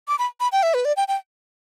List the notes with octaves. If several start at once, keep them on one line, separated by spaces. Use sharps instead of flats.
D6
B5
B5
G5
E5
B4
D5
G5
G5